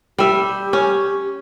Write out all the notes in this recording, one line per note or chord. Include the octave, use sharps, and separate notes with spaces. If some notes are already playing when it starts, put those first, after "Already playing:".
G3 G4 E5
C#4